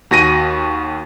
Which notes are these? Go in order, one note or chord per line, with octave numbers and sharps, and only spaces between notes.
D#2 F#4 A#6 D#7